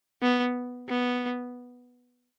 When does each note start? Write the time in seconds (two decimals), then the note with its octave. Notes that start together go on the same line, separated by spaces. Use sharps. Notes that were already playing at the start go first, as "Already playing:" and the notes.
0.22 B3
0.88 B3